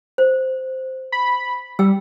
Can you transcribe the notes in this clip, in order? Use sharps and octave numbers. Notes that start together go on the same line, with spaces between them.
C5
B5
G3 G5 E6